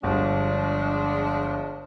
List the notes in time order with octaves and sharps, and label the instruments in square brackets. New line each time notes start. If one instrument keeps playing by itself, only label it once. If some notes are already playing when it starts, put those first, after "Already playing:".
[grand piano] G1 [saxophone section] F3 G#3 D4